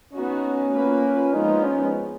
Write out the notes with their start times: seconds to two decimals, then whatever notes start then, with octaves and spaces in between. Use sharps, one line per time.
0.13 B3 C#4 D#4 F#4
0.73 A#3 F4 B4
1.34 F3 G#3 B3 D#4 F4
1.64 C#4